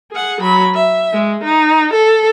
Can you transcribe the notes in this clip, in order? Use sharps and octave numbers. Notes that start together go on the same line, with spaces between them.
G#4 F#5
F#3 B5
E5
G#3
D#4
A4